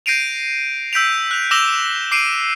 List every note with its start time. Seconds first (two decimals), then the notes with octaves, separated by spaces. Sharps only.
0.06 G6 A#6 C7 D7 D#7 F7
0.93 E6 G6 B6 D7 F7
1.31 F#6 F7
1.51 D6 E6 A#6 E7 F7 G7
2.11 D6 C7 D7 D#7